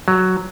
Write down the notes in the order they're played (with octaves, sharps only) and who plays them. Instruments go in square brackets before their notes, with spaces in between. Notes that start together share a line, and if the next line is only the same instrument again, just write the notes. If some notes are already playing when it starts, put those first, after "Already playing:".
[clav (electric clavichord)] F#3